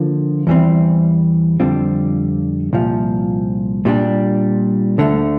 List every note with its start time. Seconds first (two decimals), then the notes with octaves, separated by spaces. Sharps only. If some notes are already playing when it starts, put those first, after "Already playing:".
Already playing: D3 F3 A#3
0.47 E2 E3 G3 C4
1.60 F2 D3 G3 C4 F4
2.73 C2 A#2 F3
3.85 A#2 G3 D4
4.98 D2 D3 A3